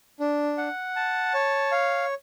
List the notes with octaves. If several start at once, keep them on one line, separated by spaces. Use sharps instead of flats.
D4
F#5
A5
C#5
F5